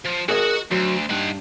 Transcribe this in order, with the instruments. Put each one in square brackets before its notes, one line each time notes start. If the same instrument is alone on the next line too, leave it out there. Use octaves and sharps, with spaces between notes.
[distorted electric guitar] F3
[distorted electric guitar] F#4 F#5 [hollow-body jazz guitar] G#4 A#4 D#5
[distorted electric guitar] D2 [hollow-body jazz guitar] F#3
[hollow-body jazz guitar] G2 [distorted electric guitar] D#4 F#5